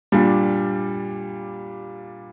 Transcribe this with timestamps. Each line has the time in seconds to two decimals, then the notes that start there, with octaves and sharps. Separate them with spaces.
0.12 A#2 G3 D4